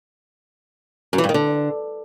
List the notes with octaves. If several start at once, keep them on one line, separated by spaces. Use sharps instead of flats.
F#2
E3
G2
D#3
D3